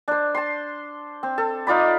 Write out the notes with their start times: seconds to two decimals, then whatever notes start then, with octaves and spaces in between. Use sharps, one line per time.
0.08 D4 C5
0.35 A5 C6
1.23 C4
1.38 A4
1.67 D#4 F4 D5 B5